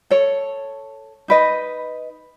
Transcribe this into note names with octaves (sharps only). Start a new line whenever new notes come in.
A4 C#5
D#4 B4 D#5